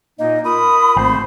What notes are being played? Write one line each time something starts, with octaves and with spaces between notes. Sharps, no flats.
A#2 A#3 D#4 D#5
F4 A#4 B5 D#6
G#1 A3 C5